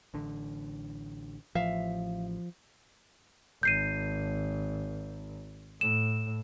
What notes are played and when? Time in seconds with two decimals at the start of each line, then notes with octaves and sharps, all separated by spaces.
0.14 A1 D3
1.55 A1 F3 E5 F5
3.63 G#1 G6 C7 D#7
5.81 A2 E7